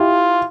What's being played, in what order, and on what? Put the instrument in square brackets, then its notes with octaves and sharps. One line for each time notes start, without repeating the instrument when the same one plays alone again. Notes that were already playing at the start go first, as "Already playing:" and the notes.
Already playing: [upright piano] E4 G4 [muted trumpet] F4